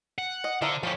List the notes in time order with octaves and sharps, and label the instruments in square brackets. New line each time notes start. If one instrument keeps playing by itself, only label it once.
[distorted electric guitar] F#5
[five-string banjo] D#5
[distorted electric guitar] D3 [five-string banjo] F3 A#4 E5
[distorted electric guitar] F3 C#4 [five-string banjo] G4 B5